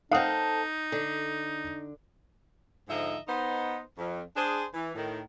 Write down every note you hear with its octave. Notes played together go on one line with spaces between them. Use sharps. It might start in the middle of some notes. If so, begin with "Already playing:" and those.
C4 D#4 A4 F5 F#5 D#6
D3
G#2 D3 F3 D#4 D#5 E5
B3 D#4 C5
F2
D4 G#4 C5
E3
A2 D#3